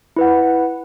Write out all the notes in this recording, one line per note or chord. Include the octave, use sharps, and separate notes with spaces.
E4 B4 F#5